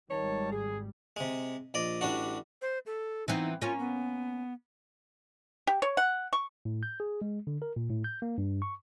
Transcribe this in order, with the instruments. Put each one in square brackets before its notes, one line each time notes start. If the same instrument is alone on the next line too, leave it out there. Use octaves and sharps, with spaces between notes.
[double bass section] G#1 G3 [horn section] D#3 C#5 A5
[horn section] G#4
[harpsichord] C3 G#3
A#1 D5 D#5
A1 G3 D4 F#4
[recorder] C5
A4
[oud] E3 B3 C4 [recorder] D#4
[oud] A#3 C#4 [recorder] F4
[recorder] B3
[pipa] G4
C#5
F#5
C#6
[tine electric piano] A2
G6
G#4
G#3
D3
A#4
A#2
A2
G6
A#3
G2
C#6